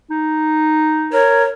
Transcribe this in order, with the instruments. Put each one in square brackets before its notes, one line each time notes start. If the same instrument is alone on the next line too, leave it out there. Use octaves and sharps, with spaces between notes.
[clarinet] D#4
[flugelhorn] A#4 [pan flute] C#5